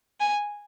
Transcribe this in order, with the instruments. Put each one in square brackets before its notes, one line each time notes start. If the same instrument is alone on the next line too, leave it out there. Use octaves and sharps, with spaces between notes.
[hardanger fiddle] G#5